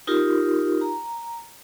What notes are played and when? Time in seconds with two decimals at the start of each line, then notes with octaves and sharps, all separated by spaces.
0.07 D#4 F4 G4 A#4
0.81 A#5